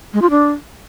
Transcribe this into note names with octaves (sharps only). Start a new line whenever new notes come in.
G#3
F4
D4